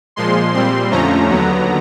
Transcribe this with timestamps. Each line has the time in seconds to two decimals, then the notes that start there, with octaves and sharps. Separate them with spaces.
0.16 A#2 F3 G#3 C6
0.53 A#2 G3 C4 C6
0.91 F2 D3 F3 A3 C#4 A#5
1.28 D#2 D3 F#3 B3